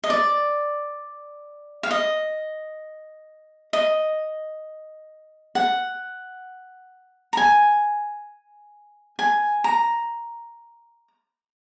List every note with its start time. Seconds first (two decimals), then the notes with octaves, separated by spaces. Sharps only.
0.04 D#5
0.10 D5
1.83 F5
1.91 D#5
3.73 D#5
5.55 F#5
7.33 A#5
7.37 G#5
9.19 G#5
9.64 A#5